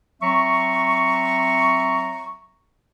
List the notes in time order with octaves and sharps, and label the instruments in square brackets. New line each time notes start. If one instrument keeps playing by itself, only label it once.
[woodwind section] F#3 C4 E5 A#5 C#6